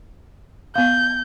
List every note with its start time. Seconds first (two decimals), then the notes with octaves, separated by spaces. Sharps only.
0.75 B3 F5 G6